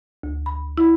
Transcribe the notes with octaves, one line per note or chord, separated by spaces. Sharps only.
D2
B5
E4